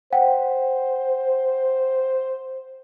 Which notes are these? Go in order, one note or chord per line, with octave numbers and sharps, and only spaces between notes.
C5 F#5 G5